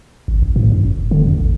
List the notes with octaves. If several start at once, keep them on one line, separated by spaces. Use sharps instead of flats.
G#1
A1
A2
F#2
F1
D3
F2
A1